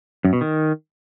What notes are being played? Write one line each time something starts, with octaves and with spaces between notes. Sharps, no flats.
F#2
B2
D#3